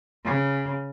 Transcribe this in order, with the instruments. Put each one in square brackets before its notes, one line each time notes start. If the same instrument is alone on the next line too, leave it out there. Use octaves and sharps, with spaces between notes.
[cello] C#3